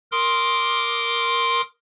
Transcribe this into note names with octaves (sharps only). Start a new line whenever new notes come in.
A#4 C6 D6 D#6